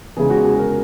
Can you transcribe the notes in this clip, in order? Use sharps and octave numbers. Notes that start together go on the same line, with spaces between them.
E2 C#3 G#3 G#4
F#4
G#4
A#4